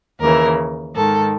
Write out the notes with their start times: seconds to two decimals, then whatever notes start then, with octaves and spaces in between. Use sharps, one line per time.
0.21 D#2 C#3 E3 A#4
0.95 G#2 D#3 A4